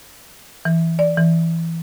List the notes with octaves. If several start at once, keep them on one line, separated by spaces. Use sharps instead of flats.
E3
D5
E3